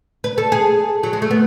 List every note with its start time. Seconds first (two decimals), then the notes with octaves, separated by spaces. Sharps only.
0.24 B4
0.38 A4
0.52 G#4
1.03 F#3
1.13 G#3
1.22 A3
1.31 B3